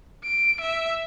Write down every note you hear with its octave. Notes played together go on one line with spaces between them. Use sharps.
D7
E5